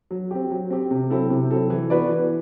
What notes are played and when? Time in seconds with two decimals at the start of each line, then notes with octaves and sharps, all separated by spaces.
0.11 F#3
0.31 C4 G4
0.51 F#3
0.70 C4 G4
0.91 C3
1.10 F#3 C4 E4 A4
1.30 C3
1.51 F#3 C4 E4 A4
1.70 E3
1.90 B3 F#4 B4 D5
2.09 E3